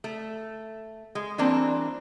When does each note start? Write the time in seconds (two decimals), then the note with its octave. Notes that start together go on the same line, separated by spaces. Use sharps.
0.04 A3
1.15 G#3
1.38 E3 G3 A#3 C4 D4